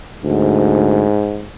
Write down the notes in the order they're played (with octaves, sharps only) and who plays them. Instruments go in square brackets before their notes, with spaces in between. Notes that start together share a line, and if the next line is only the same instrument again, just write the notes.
[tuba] D2 [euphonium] G#2